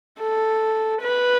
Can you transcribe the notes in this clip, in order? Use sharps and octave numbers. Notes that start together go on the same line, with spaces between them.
A4
B4